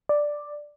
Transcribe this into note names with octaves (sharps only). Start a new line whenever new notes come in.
D5